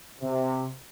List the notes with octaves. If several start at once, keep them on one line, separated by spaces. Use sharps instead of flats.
C3